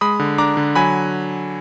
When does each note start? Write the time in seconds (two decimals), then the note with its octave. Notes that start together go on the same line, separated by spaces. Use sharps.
0.01 G#3 B5 D#6
0.20 D3
0.38 D4 A#5 D6
0.57 D3
0.75 F#3 G#5 B5